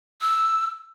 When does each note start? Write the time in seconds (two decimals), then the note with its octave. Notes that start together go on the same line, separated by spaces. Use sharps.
0.21 E6